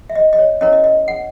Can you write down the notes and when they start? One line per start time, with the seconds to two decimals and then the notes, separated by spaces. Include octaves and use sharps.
0.10 E5
0.15 D#5
0.33 D#5
0.39 C#5
0.61 C#4 E4 A#4 C#5 D#5
0.73 D#5
0.84 D#5
1.08 F#5